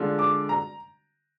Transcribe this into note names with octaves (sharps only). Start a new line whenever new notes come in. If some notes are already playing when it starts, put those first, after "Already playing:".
Already playing: D3 G#3 D4 F4
D6
A#5